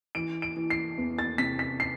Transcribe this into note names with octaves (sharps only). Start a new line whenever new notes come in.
E3 D7
D7
E3
C7
E2
A6
C3 B6
B6
C7